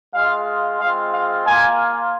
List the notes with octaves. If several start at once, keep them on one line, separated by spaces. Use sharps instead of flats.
G#3 F4 F5
G#3 C4 F4 F5
F5
A#3 F4 G#5